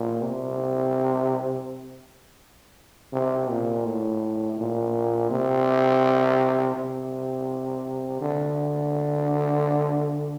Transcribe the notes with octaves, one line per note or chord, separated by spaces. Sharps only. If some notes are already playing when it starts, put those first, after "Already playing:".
Already playing: A#2
C3
C3
A#2
A2
A#2
C3
C3
D3